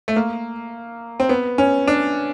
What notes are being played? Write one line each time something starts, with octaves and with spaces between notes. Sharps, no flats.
A3
A#3
C4
B3
C#4
D4